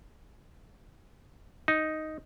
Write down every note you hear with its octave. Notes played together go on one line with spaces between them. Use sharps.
D#4